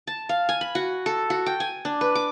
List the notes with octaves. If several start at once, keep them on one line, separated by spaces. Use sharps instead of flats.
A5
F5
G#5
B5
F#4
A4
F#4
G5
G#5
D4
B4
D6